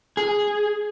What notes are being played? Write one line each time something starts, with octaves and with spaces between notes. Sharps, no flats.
G#4